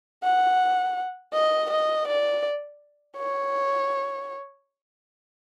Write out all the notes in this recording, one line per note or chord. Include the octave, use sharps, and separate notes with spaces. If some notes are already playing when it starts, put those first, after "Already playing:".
F#5
D#5
D#5
D5
C#5